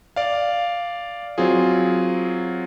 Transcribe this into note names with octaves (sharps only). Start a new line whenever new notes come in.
D5 F5
F#3 C4 F4 G#4